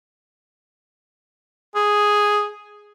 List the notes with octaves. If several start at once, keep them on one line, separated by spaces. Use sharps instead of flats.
G#4